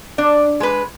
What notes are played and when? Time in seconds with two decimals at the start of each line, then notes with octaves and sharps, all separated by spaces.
0.18 D4
0.60 G#3 B4